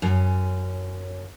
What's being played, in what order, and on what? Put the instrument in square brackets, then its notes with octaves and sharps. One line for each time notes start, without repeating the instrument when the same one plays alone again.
[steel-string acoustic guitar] F#2 C#4